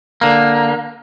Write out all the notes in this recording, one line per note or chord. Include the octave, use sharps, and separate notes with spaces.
D3 A#3